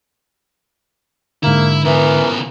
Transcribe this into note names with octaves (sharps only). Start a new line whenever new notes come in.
G#2 D3 A#3 E4
C#3 E3 B3 A#4